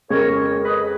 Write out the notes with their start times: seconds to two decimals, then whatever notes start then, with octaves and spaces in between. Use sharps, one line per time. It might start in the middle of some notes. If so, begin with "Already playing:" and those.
0.10 F2 C#3 G#3 A#4 C#5
0.63 B4 D#5